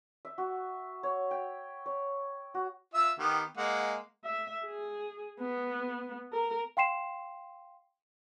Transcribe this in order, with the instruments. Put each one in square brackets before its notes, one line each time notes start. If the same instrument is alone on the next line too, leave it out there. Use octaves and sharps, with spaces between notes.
[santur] E5
F#4
C#5
G5
C#5
F#4
[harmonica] F4 E5 E6
D#3 B3 G4
G#3 A#3 F#5
[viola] E5
G#4
B3
A#4
[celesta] F5 G5 C6 C7 E7